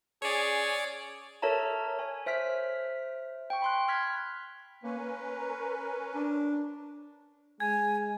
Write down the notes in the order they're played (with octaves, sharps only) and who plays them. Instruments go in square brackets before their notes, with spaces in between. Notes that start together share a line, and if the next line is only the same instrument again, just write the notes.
[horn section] C#4 G#4 G#5 [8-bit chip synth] C#5 D5
[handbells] A4 A#4 C#5 E5 A5 A#5
C#5 G#5
C5 E5 F6 B6
G5 C#6
B5 C6 F#6
F6 F#6 G#6 B6
[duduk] A#3 [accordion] C#4 B4
[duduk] A#4
[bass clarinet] D4
[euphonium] G#3 [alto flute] G#5 [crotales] G#6